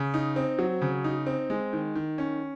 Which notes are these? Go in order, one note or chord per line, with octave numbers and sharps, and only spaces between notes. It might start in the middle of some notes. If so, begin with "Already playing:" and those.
Already playing: C#3
D#4
C4
F#3
C#3
D#4
C4
G#3
D#3
D#3
C#4